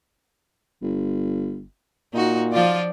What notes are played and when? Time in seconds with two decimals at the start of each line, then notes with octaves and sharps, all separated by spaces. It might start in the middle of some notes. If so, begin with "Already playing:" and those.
0.82 G1
2.14 A#2 D#4 F#4
2.53 F3 F4 D5